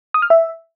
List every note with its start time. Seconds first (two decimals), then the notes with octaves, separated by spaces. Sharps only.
0.14 D#6
0.22 F6
0.30 E5